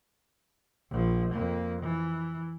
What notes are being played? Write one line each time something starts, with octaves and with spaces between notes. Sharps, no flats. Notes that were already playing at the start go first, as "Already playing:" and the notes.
A#1 F3
F2 A#3
E3